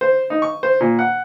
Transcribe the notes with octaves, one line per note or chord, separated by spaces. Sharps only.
C5
D#4
C#6
C5
A#2
F#5